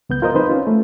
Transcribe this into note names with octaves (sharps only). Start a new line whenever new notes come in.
C#2 B3 G6
F4 A#4 C5 D#5
C4 D#4 B4 C5
C#4 F4
A3